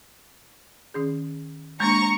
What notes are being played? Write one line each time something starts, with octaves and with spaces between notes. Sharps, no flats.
D#3 C#4 G#4
G#3 A#3 D4 A#5 C#6